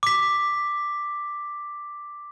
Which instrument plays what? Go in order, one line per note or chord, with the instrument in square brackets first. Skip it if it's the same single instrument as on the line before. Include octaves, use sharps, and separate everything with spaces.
[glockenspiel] D6 B6